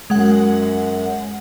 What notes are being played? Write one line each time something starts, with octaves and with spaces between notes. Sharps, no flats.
F#2 G#3 F#5